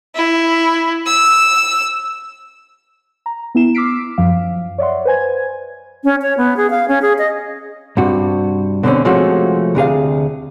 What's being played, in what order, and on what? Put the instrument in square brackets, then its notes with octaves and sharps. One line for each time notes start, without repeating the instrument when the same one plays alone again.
[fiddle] E4
E6
[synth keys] A#5
B3 E4 E7
D6 E6 F6 B6 C7 D7
F#2 F3 F5
C#5 D5 E5 F#5 C6
B4 C5 G#5 G#6
[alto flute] C#4
C#5
B3
G#4
F5
C#4
G#4
D#5
[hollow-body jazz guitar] G2 C3 F#4
B2 D3 A#3 C4 C#4
C3 F3 G#3 A3 C#4 F#4
D2 C3 G#4 F5